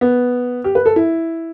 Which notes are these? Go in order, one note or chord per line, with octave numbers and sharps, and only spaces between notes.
B3
G4
B4
A4
E4